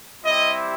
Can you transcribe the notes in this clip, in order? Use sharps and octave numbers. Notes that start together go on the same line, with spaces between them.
G3 C4 E4 G4 D#5